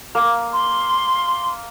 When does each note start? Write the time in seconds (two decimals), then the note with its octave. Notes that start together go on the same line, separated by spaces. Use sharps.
0.15 A#3
0.53 C6